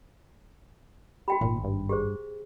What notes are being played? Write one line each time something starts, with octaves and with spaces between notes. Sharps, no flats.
F#4 G4 G5 B5
G#1 A#2
G2
G4 G#4 C5